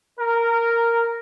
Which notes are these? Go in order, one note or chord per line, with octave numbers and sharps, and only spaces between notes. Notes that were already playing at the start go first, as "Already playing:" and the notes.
A#4